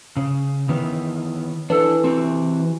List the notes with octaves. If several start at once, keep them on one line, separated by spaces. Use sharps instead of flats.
C#3
D#3 E3 B3
E3 D4 A4
C4 F#4 G4